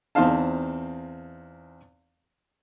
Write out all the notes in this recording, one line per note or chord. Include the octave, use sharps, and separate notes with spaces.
E2 C4 D#4 C5 F5 A5